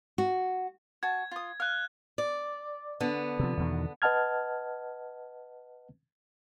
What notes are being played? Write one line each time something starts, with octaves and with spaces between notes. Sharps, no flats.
F#4
F#4 A5 G#6
F4 D#6
F5 F6 F#6
D5
D3 B3
C3 F3
E2 B2 D#3
B4 D#5 F#5 A5 F6 G#6